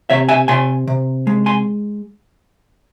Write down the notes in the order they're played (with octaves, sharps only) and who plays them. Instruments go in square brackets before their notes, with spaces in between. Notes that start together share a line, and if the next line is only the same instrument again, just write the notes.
[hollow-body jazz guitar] C3 C#5 E5
E5 G#5
C3 G#5 C6
C3
G#3
G#5 C6